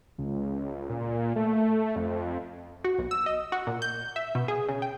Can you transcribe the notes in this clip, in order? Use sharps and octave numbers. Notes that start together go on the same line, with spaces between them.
C#2
A#2
A3
F2
F#4
B1
E6
D#5
F#4
A#2
G6
E5
B2
G#4
C#3
G5